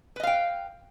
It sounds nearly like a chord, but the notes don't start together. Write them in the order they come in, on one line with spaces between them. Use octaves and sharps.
B4 D#5 F5 G5